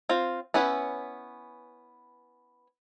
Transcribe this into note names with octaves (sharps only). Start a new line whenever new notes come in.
C4 F4
B3 C#4 E4 B4